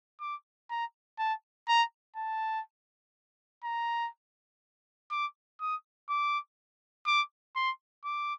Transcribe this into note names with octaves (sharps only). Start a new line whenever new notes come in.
D6
A#5
A5
A#5
A5
A#5
D6
D#6
D6
D6
C6
D6